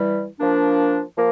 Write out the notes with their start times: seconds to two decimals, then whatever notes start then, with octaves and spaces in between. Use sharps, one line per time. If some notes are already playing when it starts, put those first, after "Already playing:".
Already playing: E3 G3
0.40 F3 A#3 D4
1.16 F3 A#3